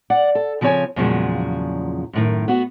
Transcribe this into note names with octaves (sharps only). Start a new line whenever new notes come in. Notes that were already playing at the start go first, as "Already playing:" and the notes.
D5 F#5
A4
C#3 F3 C4 A4 C#5 G#5
E2 A#2 C#3 F3 F#3 G#3
F#2 A2 D#3
B3 F#4